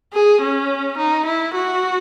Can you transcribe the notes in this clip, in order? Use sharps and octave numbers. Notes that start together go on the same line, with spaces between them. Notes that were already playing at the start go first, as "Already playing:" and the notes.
G#4
C#4
D#4
E4
F#4